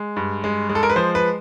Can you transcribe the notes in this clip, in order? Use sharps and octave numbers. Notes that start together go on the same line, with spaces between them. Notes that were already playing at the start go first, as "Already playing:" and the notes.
Already playing: G#3
G2
G#3
G#3
A4
A#4
B4
F3 C5
B4